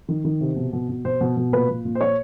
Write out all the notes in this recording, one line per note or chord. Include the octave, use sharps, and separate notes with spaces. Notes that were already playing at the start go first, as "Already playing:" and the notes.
D#3
D#3
C3
B2
B2
B2
B2 C5
B2
B2
A#2 B4
A#2
A#2
C5
A#2 C#5